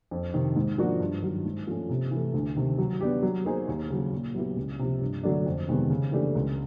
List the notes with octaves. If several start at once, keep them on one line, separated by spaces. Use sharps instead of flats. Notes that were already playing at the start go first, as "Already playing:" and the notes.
F2
C3 D#3
G#2
F3 A#3 D4 F#4
G2
D#3 F#3
G#2
F3 A3 C#4
C3
E3
A3
D2
C3 D#3
F#3
B3 D4 G4
F#3
A#3 D#4 G#4 C5
D#2
C#3 F#3
A#2
F#3 B3 E4 G4
C#2
C3 F3
G2
D3 F#3 A3 D4
F2
C3 D#3 G#3 B3
C#3
E3 A3 D4 G4
C#2